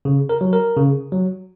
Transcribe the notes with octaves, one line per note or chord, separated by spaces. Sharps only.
C#3
A#4
F#3
A#4
C#3
F#3